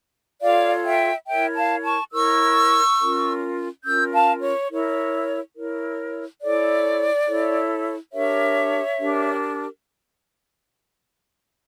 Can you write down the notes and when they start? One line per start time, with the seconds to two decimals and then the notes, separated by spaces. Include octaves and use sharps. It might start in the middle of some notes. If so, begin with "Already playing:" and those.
0.41 F4 A4 C#5 D5 F5
0.84 E5 G5
1.27 E4 A#4 C#5 E5 G5
1.56 F5 A5
1.85 A5 C#6
2.13 E4 A#4 C#5 C#6 E6
2.99 C#4 F4 A#4
3.84 C#4 F4 A#4 E6 G6
4.13 F5 A5
4.41 C#5
4.70 E4 A#4 C#5
5.55 E4 A#4 C#5
6.41 E4 A4 C#5 D5
7.27 E4 A4 C#5
8.12 D4 G4 A#4 C#5 E5
8.98 D4 G4 A#4